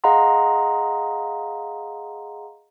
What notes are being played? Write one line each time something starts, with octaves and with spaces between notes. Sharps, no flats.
G#4 D#5 F5 F#5 A#5 C6